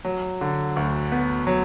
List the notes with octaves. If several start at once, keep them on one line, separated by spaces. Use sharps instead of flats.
F#3
D3
D2
B3
F#3